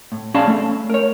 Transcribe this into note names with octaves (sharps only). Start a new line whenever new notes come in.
A2
C#4 G#4 D5 F5 A5 B5
A3
A#4 C#5